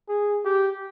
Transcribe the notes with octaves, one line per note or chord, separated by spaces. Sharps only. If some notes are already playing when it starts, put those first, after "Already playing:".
G#4
G4